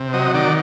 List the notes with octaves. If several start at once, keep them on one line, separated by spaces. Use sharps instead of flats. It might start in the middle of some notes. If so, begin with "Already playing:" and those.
Already playing: C3
F#3 D#5
D#3 D5